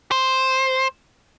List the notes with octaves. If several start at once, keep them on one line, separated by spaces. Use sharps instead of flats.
C5